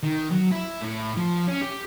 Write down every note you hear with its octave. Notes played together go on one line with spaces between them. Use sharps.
D#3
F#3
E4
A2
F3
C#4
G4